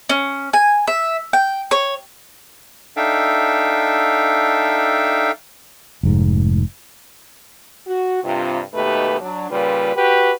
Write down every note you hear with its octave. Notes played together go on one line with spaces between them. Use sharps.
C#4
G#5
E5
G5
C#5
D4 D#4 A4 E5 F5 G5
F1 G#2
F#4
G2 C3 F4
D#2 B2 A3 D#4 G4 B4
F#3 D4
A#2 C#3 G3 F4 B4
F#4 G4 B4